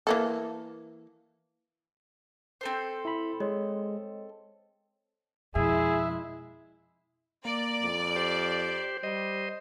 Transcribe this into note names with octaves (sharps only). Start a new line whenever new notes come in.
E3 A#3 A4
C4 A4 C5
E4 B5
G#3 C#5 D#5
F2 B2 G#3 E4 G#4 E5
A#3 D5
F2
G4 C5
G3 C5 D#5